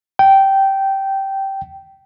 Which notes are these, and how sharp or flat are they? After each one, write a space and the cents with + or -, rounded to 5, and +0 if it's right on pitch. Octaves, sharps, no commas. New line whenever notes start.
G5 -10